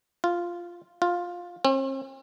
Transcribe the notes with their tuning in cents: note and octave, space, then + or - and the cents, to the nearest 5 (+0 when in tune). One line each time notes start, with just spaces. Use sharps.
F4 -5
F4 +10
C4 +45